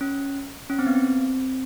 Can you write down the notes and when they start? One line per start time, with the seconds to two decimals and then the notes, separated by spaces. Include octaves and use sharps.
0.01 C#4
0.70 C#4
0.79 C4
0.87 B3
0.95 C4